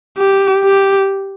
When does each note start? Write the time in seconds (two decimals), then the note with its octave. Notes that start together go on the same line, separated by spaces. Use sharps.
0.18 G4
0.64 G4